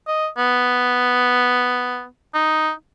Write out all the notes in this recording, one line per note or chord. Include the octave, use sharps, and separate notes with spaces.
D#5
B3
D#4